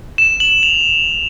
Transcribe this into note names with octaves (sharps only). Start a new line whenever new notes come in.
E7
F#7
F7